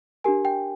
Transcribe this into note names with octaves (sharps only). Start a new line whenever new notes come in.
D4 G4 A#4 G#5
G5